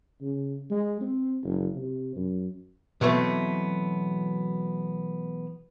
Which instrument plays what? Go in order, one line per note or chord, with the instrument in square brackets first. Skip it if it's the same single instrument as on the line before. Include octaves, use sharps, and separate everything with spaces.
[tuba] C#3
G#3
C4
F#1
C3
F#2
[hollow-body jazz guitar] B2 E3 F#3 A3 B3 C4